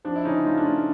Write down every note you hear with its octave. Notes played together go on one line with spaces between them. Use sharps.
F3 D4
E4
C#3 C#4 D#4
A3 D#4 F4
D4
A3 C#4
C#4